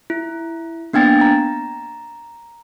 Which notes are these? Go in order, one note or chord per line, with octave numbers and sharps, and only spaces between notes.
E4
A#3 B3 D4 G5 A6
A#5